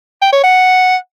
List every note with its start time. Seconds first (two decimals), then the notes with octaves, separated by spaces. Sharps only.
0.22 G5
0.33 C#5
0.44 F#5